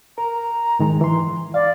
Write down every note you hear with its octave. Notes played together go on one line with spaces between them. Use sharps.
A#4 A#5
G#2 D#3 G#3
E3 C6
D5 F5